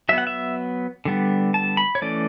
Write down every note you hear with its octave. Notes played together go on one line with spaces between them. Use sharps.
F#3 B3 E5
F#5
E5
D3 G3 B3
A5
B5
C#5
E3 A3 C#4 D5